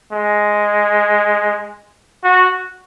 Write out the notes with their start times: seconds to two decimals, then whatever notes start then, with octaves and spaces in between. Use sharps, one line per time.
0.13 G#3
2.24 F#4